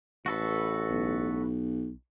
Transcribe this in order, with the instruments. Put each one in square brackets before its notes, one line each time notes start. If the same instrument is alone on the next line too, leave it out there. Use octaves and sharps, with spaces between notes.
[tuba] A1 [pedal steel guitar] F#4 A4 B4
[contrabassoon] B1